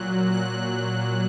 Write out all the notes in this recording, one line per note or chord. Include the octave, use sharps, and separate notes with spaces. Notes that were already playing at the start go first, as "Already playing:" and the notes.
Already playing: A#2 F#3 F#6
F#6